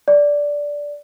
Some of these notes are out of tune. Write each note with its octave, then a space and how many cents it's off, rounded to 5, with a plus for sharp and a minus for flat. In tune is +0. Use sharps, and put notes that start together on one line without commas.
D5 -10